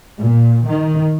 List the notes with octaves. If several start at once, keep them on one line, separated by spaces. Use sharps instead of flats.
A#2
D#3